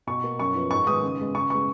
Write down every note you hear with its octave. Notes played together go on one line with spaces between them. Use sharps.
B2 C#6
A#3
F#2 C#6
F3 B3
G#2 C#6
D#3 G#3 B3 D#6
C#3
G#3 B3
C#3 C#6
G#3 B3 C#6